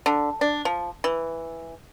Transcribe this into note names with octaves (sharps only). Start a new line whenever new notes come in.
D3
D4
F3
E3